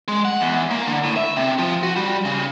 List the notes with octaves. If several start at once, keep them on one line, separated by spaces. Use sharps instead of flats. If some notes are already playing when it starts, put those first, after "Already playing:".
G#3
F#5
E2
A#3
D3
A2
E5
C3
F3
F#4
G3
C#3